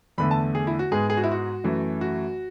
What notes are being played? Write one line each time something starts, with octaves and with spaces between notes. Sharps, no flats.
E2 D3 A3 B5
A5
G#4
E4
F#4
G#2 G#3 B3 G#4
G#4
F#4
E4
F#4
F#2 E3 A3
F#4